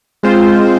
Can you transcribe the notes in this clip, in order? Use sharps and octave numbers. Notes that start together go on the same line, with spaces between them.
G#3 C4 F4 C5